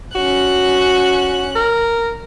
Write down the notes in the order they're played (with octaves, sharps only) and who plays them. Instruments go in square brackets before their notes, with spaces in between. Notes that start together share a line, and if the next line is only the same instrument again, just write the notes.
[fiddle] C#4 F#6 [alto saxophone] F#4
[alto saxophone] A#4